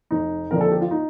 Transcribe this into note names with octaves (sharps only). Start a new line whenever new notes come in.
F1 D#4
D#2 D3 F3 C4 A#4
A4
G4
F4
D#4